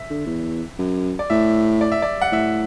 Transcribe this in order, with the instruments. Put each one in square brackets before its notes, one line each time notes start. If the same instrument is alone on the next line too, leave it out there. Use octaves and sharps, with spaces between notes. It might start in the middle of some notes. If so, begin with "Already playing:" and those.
Already playing: [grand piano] E5
[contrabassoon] D3
E2
F#2
[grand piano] D5
[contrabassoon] A2 [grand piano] E5
[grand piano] D5
E5
D5
F#5
[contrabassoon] A2 [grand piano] E5